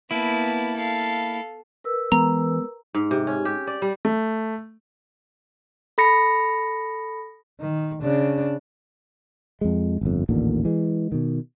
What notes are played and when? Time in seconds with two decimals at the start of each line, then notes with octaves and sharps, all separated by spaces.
0.11 A#3 B3 E4 A5
0.76 A4 F5
1.84 A#4 B4 E6
2.12 E3 G#3 B3 A#5
2.94 G#2
3.11 C3
3.27 C#4
3.45 G4
3.67 D5
3.82 G3
4.05 A3
5.98 A4 B5 A#6 C#7
7.60 D#3
8.03 C#3 D4
9.61 F2 G#3
10.01 G1 F2
10.29 A1 D#2 A#2 D3
10.65 E3 G#3
11.12 B2 D#3